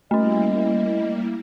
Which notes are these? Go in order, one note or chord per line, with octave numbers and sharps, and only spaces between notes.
G3 A3 A#3 C#4 E4 D#5